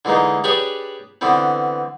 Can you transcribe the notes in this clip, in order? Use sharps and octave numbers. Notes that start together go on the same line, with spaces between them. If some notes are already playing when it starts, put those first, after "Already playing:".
D3 E3 G#3 A#3 D#4
D4 G4 G#4 B4 C#5 D5
D3 E3 B3 C4